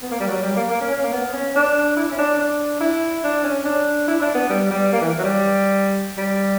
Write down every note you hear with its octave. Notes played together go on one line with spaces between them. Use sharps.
B3
A#3
G3
F#3
G3
A#3
A#3
C#4
C#4
A#3
B3
C#4
D4
E4
C#4
D4
D4
E4
D4
C#4
D4
E4
D4
B3
G3
G3
A#3
E3
F#3
G3
G3